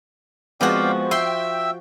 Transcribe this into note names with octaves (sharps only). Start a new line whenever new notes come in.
F3 G#3 B3 C4 F#4 D5 F5 G5
E5 G5 C6 E6